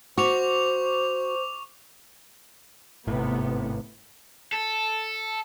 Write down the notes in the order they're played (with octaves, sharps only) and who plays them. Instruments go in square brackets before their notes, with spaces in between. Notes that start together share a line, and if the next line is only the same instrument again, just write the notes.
[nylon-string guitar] F#4 [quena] C5 [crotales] C#6 D6 F7
[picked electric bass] G#1 A2 [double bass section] C3 [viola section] B3
[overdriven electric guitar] A4